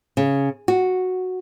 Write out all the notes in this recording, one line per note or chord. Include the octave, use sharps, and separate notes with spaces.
C#3
F#4